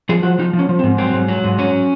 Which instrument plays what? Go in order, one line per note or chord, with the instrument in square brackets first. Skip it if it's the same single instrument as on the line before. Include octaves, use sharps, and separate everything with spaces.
[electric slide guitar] F3 G#4
F3 F#4
F3 D#4
F3
C#4
F3
C4
G#2
F#3 C4
G#2
F#3
G#2
F#3 C#4